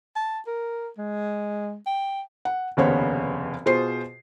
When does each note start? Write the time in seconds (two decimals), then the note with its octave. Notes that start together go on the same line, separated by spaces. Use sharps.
0.16 A5
0.47 A#4
0.98 G#3
1.87 G5
2.45 F#5
2.77 F1 D#2 C#3 B3 C5 C#5
3.66 B2 F4 G#4 C5 C7